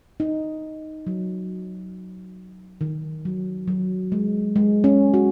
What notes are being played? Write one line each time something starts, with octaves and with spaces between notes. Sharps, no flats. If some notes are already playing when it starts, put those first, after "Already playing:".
D#4
F#3
D#3
F#3
F#3
G#3
G#3
C#4
F#4